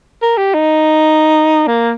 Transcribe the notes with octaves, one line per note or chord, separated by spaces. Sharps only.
A#4
G4
D#4
A#3